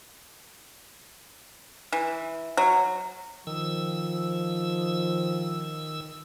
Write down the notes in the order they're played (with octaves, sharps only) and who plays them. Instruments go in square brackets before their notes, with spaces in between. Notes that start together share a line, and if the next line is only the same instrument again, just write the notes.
[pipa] E3
F#3
[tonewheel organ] D#3 E6 [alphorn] F3